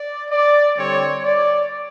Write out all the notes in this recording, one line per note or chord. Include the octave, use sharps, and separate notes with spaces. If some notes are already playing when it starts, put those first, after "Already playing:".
Already playing: D5
D5
D3 G3 C4 C#5
D5